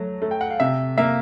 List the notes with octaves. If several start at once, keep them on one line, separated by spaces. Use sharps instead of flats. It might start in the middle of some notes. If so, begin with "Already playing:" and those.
Already playing: F#3 A3
A3
G5
F#5
F5
C3 E5
A#3 E5